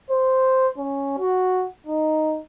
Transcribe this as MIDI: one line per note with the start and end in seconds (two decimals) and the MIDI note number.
0.11 0.70 72
0.78 1.16 61
1.18 1.66 66
1.87 2.40 63